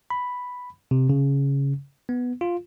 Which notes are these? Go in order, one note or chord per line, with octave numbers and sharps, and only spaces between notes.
B5
C3
C#3
B3
F4